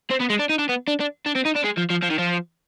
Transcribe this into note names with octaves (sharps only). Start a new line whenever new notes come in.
C4
B3
G#3
D4
D#4
D4
B3
D4
D4
D4
C4
D#4
D4
G#3
F3
F3
F3
D#3
F3